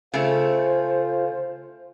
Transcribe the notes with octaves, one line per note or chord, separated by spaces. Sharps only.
C#3 A3 F4 C5